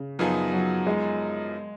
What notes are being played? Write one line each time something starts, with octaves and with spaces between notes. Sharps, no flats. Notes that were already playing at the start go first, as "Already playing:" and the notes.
Already playing: C#3
F#2 F3 B3 D#4 G#4
F#3
G#3